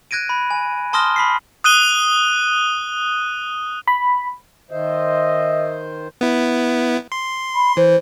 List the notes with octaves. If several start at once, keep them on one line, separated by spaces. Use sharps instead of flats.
F#6 G#6 A#6 D7 D#7
B5
G#5
A5 C6 D#6 F6 A#6 G7
B5 B6 C7
D#6 F#6 D#7 G7
B5
D#3 C5 D#5 E5
B3 E4
C6
B5
E3 C5